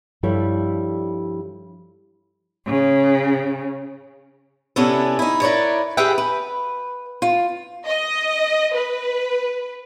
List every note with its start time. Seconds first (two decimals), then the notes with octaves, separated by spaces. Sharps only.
0.23 G2 F3 G3 E4 A4 C#5
2.68 C#3
4.76 C3 B3 C#4 D4 E4 A4
5.19 D#4 E4
5.42 E4 A#4 B4 C#5 D5
5.97 G4 G#4 B4 E5 F#5 G5
6.18 B4
7.22 F4
7.86 D#5
8.74 B4